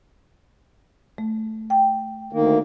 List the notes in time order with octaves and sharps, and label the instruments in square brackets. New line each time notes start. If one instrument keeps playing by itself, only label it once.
[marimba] A3
G5
[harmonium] D2 D#3 A#3